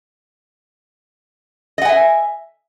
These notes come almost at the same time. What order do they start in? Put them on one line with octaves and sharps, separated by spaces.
D#5 F#5 G#5 E5